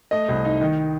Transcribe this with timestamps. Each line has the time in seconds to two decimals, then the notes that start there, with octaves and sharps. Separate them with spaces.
0.11 A3 D#5
0.29 C2
0.45 D#4
0.61 D#3